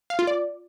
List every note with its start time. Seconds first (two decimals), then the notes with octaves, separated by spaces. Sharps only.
0.10 F5
0.19 F4
0.27 D5